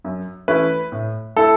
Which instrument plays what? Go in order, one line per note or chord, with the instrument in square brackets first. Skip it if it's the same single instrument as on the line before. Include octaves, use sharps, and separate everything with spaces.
[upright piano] F#2
E3 A3 C#4 E4 B4
A2
A3 E4 A4